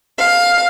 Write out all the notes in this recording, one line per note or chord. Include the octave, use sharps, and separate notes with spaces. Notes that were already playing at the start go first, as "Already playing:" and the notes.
F5